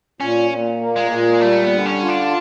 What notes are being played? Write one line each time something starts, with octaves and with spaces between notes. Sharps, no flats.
A#2 C#4
A#2
A#3
G#3
A#2
G3 A3
B3
D3
C#4
F4
D4